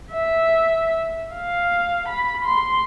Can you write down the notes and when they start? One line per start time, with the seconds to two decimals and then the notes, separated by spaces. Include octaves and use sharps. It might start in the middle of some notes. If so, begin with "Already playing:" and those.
0.13 E5
1.36 F5
2.08 B5
2.45 C6